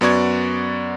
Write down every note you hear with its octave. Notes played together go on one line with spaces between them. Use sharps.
F#2 B3 F#4 D5 C#6 G#6